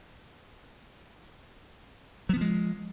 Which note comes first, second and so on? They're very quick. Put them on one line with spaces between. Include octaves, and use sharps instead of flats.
F#3 B3 F3 G#3